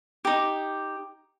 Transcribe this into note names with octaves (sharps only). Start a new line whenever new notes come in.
D#4 G4